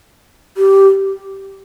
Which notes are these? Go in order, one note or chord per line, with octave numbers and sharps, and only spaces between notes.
G4